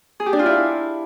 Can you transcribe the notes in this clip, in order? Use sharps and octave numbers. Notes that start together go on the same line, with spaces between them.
G#4
G4
D4
F4
E4